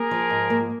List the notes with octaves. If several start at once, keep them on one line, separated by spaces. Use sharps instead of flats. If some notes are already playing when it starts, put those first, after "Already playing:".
Already playing: A#3 G#4 A#4
F3
G#2
A#3